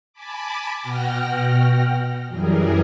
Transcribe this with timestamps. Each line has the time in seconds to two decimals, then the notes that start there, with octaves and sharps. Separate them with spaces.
0.13 G#5 A5 B5 D6
0.82 B2 F#4 F#5 G5 F6 A#6
2.27 F#2 E3 F#3 G3 G#4 A#4